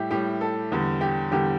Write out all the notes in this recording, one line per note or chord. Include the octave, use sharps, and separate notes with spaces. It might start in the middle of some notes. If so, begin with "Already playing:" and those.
Already playing: A2 G3 E4 G4
A2 G3 G4
A4
E2 D3 G3
G4
E2 D3 G3 G4